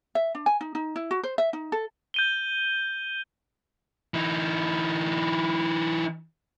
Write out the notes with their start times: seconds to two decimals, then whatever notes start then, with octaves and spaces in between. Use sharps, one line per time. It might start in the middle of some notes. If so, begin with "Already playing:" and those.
0.15 E5
0.35 D4
0.46 G#5
0.61 D#4
0.75 D#4
0.96 E4
1.11 F#4
1.23 C5
1.38 E5
1.53 D#4
1.72 A4
2.14 G6 D#7 G7
4.14 E3 D#4